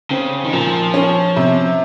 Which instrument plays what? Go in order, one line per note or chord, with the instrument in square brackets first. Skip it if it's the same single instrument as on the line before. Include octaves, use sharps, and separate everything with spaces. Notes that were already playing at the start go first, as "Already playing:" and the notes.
[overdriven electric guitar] C#3 [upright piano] C4
[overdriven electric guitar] D#3
[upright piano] A#2 [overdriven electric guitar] F3
[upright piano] C#4
C3